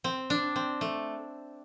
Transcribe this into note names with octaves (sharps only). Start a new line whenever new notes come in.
C4
D4
C4
A3